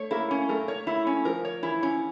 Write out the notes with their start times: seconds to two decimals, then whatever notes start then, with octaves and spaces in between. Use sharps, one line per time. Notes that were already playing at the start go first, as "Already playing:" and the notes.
Already playing: A3 C#5
0.11 A#3 E4
0.31 C#4
0.49 A3 A#4
0.68 C#5
0.87 E4
1.07 C#4
1.25 F3 A#4
1.45 C#5
1.63 E3 E4
1.83 C#4